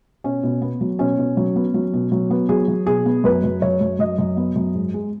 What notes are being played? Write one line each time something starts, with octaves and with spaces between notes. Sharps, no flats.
B2 C#4
B2
B3
F#3
B2 C#4
B2
F#3
B3
F#3
B2
F#3
B3
F#3 G#4
F#3
B2 G#4
B3
F#2 B4
F#2
F#2 C#5
F#2
F#2 D#5
F#2
B3
F#2
G#2
G#3